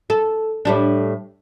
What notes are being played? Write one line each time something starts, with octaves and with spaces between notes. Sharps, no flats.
A4
A2 G3 D4